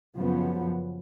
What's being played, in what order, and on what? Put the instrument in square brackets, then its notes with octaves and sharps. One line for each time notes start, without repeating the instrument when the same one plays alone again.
[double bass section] F#2 C#3 F3 B3